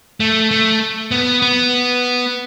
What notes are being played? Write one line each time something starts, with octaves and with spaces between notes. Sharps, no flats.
A3
A3
B3
B3